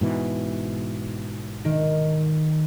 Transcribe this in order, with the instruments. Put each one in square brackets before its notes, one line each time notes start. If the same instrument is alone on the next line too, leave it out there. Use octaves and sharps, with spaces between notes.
[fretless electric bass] G#2 B2 E3
[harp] D#3